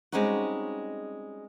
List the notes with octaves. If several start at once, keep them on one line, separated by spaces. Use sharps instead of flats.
G3 G#3 C4 C#4 D#4 F#4